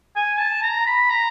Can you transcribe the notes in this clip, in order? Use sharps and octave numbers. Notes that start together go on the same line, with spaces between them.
G#5
A5
A#5
B5
A#5